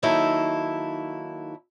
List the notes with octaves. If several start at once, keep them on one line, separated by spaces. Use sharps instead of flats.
D#3 F#3 A#3 D#4 E4 A4